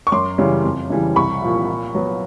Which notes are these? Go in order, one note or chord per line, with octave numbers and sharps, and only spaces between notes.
C#6
F#2 C6 D6
C#3 E3 G3
F2
C#3 E3 G3
C2 B5 C#6
A#2 F3
A#2
F#3 B3